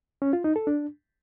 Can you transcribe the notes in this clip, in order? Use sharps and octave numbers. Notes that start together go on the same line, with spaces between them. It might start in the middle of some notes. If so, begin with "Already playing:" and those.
C#4
F4
D#4
A4
D4